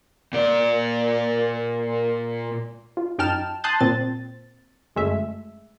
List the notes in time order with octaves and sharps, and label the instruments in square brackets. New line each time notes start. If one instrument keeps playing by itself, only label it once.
[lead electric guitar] A#2 D5
[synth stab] F4
F#2 D#4 G5 A5 F6 E7
A5 C6 D#6 F#6 G6 A6
A#2 C4 A6
G1 F#2 G#3 A3 E5